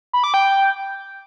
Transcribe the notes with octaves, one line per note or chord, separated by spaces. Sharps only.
B5
D6
G5